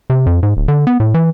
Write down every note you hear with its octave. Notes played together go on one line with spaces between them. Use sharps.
C3
F2
G#2
D1
D3
B3
A2
E3